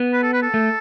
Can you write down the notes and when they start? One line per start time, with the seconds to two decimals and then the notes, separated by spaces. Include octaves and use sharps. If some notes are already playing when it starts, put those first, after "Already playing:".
Already playing: B3
0.13 B4
0.23 A4
0.33 B4
0.43 A4
0.54 A3